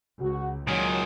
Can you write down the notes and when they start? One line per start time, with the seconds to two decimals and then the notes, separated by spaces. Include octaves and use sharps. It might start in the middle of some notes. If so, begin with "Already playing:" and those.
0.21 C#2 F#4
0.67 A#2 D#3 F#3 G#4